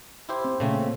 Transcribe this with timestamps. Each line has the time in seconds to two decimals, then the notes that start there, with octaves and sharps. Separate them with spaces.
0.29 E4 G4 C5
0.45 C4
0.60 A#2 C#3 A3 C4